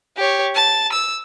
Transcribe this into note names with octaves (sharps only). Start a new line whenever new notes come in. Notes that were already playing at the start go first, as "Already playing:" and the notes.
G4 C#5
A5
E6